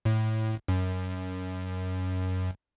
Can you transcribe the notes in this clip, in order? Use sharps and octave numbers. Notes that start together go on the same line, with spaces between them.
A2
F#2